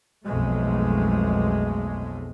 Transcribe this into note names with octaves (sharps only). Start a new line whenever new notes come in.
B1 F2 G#3 A3